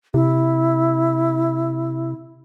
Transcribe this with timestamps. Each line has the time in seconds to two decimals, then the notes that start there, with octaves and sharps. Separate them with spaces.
0.14 C3 E4